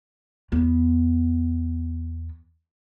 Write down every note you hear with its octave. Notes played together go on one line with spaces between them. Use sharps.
E2 B3